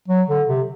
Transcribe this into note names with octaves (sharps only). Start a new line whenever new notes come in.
F#3
D3
C3